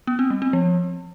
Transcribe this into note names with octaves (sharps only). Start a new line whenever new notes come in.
B3
C4
G3
C4
F3